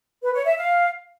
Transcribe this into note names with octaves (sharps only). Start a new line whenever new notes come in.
B4
C#5
E5
F5